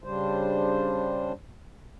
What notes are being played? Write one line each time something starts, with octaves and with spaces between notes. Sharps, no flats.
C#3 G3 D4 C5